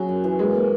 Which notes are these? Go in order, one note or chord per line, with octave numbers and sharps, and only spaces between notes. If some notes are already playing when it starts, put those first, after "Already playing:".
Already playing: C#3 F#3
F#2
E3
G#3 A#3
A#3